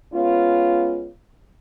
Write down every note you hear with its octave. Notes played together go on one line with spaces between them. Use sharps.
G#3 B3 C#4 F4